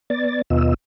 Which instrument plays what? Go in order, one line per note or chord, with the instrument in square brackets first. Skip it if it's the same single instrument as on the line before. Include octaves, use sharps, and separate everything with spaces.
[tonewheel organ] B3 D5 A6
D#2 B2 B3 F4 D#5 E6